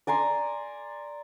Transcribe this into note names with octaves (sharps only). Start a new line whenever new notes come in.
D5 G#5 A#5 C6